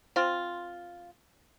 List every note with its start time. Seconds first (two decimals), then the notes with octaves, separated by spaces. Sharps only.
0.16 C4 F4